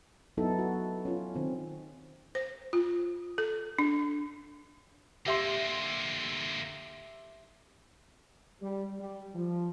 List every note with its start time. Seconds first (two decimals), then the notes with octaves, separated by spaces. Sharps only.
0.37 F#3 B3 D#4 E4 A4
0.59 F#4
1.05 C#4 F4
1.35 D#3 C4
2.35 C5
2.73 F4
3.38 A4
3.79 D4
5.26 D3 A#3 G4 E5 C6
8.62 G3
8.99 G3
9.35 F3